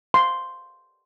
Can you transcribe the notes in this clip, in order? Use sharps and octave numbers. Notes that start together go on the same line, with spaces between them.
C6